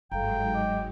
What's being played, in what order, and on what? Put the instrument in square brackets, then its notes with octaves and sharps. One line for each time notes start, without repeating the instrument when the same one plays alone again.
[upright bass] G1 [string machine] G#2 F#3 G#3 [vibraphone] A4 F5 A#5 [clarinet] G5
[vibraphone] D#5 D6